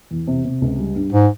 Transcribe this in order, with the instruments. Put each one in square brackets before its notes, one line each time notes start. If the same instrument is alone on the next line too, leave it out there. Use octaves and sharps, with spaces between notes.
[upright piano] E2
C3
C3
C#2
G3
G2
[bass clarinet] G#2